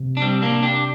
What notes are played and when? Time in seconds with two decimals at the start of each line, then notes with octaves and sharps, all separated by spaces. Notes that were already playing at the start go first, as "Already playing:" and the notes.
Already playing: C3
0.17 D4
0.22 G3 C4
0.42 A#3 D4
0.63 D4 G4